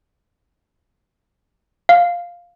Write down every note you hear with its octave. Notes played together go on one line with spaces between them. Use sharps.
F5